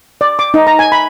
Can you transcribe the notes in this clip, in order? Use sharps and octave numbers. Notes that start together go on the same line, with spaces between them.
D5
D6
D#4
A#5
G#5
B5